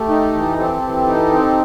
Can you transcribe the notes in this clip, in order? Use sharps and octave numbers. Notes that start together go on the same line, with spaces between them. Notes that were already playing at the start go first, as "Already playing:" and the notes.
Already playing: A3 G4 A4
D#4
E3
C4 G4 A4
E3
D#4
C4